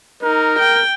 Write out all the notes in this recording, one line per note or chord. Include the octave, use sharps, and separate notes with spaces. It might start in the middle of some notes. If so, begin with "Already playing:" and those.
D#4 A#4
G5